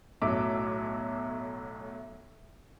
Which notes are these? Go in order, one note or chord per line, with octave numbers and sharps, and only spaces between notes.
B1 A2 F#3 E5 D6